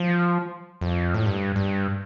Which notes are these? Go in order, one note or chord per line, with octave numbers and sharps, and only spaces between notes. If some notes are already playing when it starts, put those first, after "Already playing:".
Already playing: F3
F2
A2
G2
G2